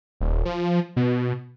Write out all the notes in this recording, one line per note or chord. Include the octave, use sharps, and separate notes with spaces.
D#1
F3
B2